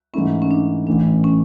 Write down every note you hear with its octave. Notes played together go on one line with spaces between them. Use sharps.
G#2 E3 A3 C#4 E4
C#4
D4
A1 A2 E3 A3 D4
C#4